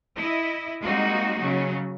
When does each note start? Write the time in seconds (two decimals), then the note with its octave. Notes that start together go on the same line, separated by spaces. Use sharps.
0.18 E4 D#5
0.82 G3 G#3 A#3 C4 D#4 F#4
1.39 C#3 F#3 C#4